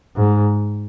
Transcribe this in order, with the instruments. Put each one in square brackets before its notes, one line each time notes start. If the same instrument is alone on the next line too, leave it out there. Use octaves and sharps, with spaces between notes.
[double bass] G#2